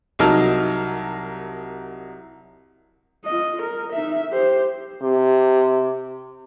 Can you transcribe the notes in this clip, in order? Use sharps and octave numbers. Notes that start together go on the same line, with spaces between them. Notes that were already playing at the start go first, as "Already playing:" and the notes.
C2 F#3 D#4 A#4 A5 F6
F4 D#5
A#4
D#4 E5
G4 C5
C3